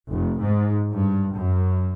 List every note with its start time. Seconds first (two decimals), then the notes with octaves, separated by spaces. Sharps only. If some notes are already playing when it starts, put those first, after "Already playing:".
0.10 F1
0.40 G#2
0.92 G2
1.35 F#2